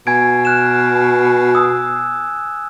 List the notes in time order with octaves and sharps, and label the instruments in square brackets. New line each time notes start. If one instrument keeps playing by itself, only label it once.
[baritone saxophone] B2 [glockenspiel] G#5 G#6 D7
[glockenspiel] F6 F#6 E7
D#6 E6